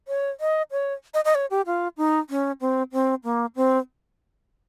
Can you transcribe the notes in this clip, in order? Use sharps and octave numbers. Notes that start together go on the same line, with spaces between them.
C#5
D#5
C#5
D#5
D#5
C#5
G4
F4
D#4
C#4
C4
C4
A#3
C4